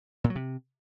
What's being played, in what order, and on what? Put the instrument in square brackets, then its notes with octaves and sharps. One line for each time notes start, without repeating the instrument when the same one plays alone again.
[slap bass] A#2
F#3
C3